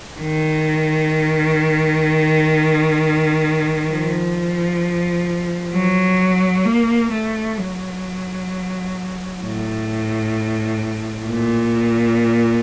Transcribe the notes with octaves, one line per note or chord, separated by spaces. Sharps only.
D#3
F3
F#3
A#3
A3
F#3
A2
A#2